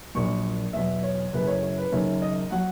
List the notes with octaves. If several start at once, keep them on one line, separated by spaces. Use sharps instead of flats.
A#1 A#2 F#3 C#6
E2 B2 F#3 E5
C#5
F#1 F#2 E3 B4
C#5
C#5
B4
F#1 F#2 D#3 C#5
D#5
F#3 F#5